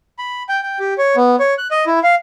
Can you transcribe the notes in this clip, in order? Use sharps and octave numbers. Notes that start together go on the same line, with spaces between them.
B5
G5
G5
G4
C#5
B3
C#5
F#6
D#5
E4
F5